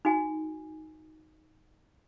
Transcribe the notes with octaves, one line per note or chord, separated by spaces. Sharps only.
D#4 F#4 G#5